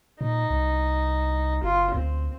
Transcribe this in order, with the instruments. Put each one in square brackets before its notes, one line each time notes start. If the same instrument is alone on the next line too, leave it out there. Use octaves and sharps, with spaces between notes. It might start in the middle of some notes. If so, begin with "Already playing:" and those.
[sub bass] A#2 [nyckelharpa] D#4
[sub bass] C2
[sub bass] F#1 [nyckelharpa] F4
[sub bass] D2 [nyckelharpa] C4